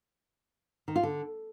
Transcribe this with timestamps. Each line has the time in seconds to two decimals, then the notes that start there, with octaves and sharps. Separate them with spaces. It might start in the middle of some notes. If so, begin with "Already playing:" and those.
0.88 D#3
0.96 F4
1.03 D3